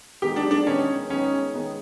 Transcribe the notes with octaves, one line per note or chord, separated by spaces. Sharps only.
D#3 G#3 B3 D#4 G4
D4
D4
D#3 G#3 B3 C#4 D#4
D#3 G#3 B3 C#4 D#4
D#3 G#3 B3 D#4